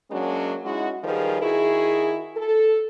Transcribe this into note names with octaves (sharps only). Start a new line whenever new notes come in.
F#3 G#3 A#3 C#4 D4 F#4
G#3 C#4 D#4 E4 F#4
D#3 F3 G3 G#4 A#4 B4
D#3 E4 F#4 G#4
A4